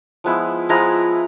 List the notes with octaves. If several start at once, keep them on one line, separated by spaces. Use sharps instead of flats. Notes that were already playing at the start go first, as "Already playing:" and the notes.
F3 G#3 B3 E4
F3 G#3 B3 E4 A#5